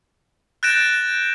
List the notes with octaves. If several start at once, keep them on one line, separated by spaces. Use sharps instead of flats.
F#6 G6 A6 A#6 D7 E7